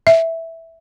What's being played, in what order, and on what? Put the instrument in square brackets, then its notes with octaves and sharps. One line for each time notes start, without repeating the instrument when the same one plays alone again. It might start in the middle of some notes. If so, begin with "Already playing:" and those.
[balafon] E5